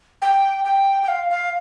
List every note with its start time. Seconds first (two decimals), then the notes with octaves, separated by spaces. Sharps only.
0.22 G5
0.65 G5
1.03 G5
1.08 F5
1.30 F5